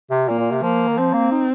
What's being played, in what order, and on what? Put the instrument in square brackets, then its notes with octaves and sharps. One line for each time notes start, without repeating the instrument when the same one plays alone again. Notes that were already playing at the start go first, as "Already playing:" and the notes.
[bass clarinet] C3
[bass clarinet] A#2 [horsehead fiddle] A#3
[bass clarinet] A#2
C3
[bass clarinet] F3 [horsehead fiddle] A#3
[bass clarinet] D#3
[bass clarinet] F3 [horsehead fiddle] C4
[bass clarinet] A#3
D#4